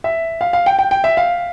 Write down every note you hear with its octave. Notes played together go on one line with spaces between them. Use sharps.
E5
F5
F5
G5
G5
G5
E5
F5